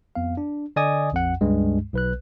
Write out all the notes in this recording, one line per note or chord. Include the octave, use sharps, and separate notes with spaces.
F2 B3 F5
D4
D3 D5 D#5 G#5 D#6
A#1 F2 F#5
C#2 G2 G#3
B1 B4 F#6